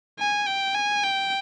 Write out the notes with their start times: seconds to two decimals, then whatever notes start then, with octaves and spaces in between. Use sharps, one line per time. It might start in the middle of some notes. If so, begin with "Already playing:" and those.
0.19 G#5
0.46 G5
0.75 G#5
1.04 G5